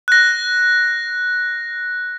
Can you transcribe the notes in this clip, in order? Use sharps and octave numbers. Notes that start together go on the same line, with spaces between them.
F#6 A#6